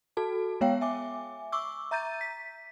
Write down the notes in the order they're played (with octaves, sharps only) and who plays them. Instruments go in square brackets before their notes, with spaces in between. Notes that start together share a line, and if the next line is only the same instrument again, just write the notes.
[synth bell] F#4 A4 A5
G#3 B3 C#5 F5 G5
E5 G#5 D6
C#6 D6 E6
E5 A#5 G6 A6 D#7
B6